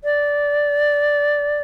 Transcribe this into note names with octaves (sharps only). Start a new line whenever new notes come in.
D5